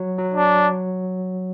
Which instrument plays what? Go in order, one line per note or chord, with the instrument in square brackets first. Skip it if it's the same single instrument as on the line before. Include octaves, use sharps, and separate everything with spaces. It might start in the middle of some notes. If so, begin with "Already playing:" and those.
Already playing: [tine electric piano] F#3
F#3
[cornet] D4